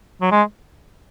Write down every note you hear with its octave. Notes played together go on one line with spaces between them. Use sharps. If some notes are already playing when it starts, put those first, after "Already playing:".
F#3
G#3